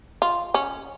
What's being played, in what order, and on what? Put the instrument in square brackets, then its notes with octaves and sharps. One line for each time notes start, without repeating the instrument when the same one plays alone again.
[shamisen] F4
C#4